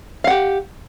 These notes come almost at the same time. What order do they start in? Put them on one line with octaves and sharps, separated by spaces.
F5 F#5 G4